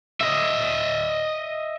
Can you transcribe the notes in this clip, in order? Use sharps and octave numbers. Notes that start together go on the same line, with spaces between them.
D#5 E5